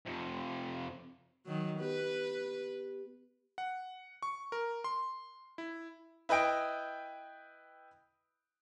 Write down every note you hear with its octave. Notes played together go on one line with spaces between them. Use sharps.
F2 C3
D#3 F#3
B3 G4 B4
F#5
C#6
A#4
C6
E4
E4 B4 D#5 G5 D7